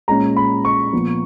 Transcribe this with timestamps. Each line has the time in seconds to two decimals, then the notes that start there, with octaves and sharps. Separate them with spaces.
0.08 A#2 G#3 C#4 A#5
0.36 B5
0.65 C#6
0.93 A#2 F3 B3